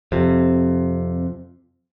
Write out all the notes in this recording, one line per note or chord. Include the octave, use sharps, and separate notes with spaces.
F2 C3